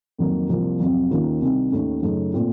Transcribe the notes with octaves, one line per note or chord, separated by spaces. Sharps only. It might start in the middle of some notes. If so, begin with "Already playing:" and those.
F2 D#3 F#3 A#3 D#4
C2 C3 F3 A#3
F2 C3 F#3
D#2 D#3 A#3 C#4 F4
C2 C3 D#3
D#2 D#3 A3 C#4
F#2 C#3 A3 D#4
A#2 A3 C4 F4